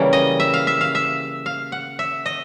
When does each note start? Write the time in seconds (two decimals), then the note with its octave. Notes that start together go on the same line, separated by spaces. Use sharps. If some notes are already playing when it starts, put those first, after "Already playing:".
Already playing: C#3 E3 G3 A#3
0.13 D#5
0.40 E5
0.54 F5
0.67 E5
0.81 F5
0.95 E5
1.46 F5
1.72 F#5
1.99 E5
2.26 D#5